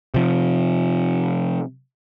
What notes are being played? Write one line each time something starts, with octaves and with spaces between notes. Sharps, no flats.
C3 F3